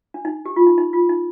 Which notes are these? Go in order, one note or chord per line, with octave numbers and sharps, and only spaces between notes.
D4
D#4
G4
F4
D#4
D#4
F4
D#4